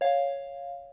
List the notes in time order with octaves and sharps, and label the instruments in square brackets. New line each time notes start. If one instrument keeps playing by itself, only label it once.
[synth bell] C#5 F5